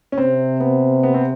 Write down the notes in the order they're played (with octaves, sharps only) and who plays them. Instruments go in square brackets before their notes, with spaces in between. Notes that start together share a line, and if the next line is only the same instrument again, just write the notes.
[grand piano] C#4
[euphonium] C3 [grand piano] C4
[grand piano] B3
B3
C4